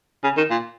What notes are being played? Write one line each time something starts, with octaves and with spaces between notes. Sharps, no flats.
C#3
D#3
A#2